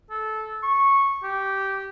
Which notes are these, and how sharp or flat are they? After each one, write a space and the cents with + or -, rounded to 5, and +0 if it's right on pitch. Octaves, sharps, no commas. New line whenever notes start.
A4 -15
C#6 -10
G4 -10